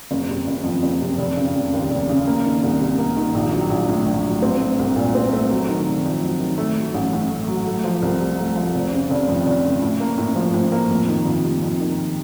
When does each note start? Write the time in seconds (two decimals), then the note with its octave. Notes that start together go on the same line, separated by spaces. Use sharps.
0.11 F#1
0.29 C3
0.47 F#1
0.64 F2
0.83 F#1
1.01 C3
1.18 F1
1.36 C#3
1.55 F1
1.73 D#2
1.90 F1
2.09 C#3
2.27 A#3
2.45 D#3
2.63 C2
2.81 C3
2.98 A#3
3.17 D#3
3.35 A#1
3.52 F#3
3.70 A#1
3.89 A2
4.06 A#1
4.24 F#3
4.42 C4
4.60 A3
4.79 C2
4.96 A#2
5.15 C4
5.32 A3
5.50 F#3
5.69 D#3
5.86 F1
6.05 F2
6.23 F#3
6.40 D#3
6.58 A3
6.76 F#3
6.94 A1
7.13 A2
7.30 A3
7.48 F#3
7.67 A3
7.84 F3
8.02 C2
8.21 C3
8.39 A3
8.56 F3
8.75 F1
8.92 C#3
9.10 F1
9.28 F2
9.46 F1
9.64 C#3
9.82 A2
10.00 A#3
10.18 A2
10.36 F3
10.54 A2
10.72 A#3
10.91 F2
11.08 D#3
11.25 F2
11.44 C3
11.62 F2
11.80 D#3